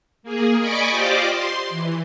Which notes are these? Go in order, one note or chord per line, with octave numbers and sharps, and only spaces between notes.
A#3 G#4
D5 D#5 G#5 B5 C#6 D6
F4 G4 C5 D5 D#5 D6
C6
E3